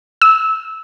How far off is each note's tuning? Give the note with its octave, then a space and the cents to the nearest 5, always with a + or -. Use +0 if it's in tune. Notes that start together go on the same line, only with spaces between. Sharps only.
E6 -15